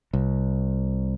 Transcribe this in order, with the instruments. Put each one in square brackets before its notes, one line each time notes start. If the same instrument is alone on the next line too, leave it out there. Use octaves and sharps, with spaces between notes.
[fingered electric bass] C2